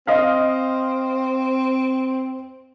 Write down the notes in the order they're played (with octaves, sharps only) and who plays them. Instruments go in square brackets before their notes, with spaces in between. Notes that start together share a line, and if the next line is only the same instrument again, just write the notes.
[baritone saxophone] C4 [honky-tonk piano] D#5 F5